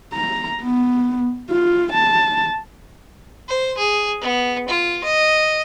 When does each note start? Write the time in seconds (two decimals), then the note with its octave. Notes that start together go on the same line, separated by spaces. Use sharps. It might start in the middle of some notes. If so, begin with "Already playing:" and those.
0.13 A#5
0.62 B3
1.50 F4
1.93 A5
3.49 C5
3.78 G#4
4.21 B3
4.69 F4
5.04 D#5